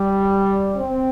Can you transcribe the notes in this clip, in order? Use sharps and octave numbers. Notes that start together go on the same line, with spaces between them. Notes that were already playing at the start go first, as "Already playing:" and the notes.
Already playing: G3
C4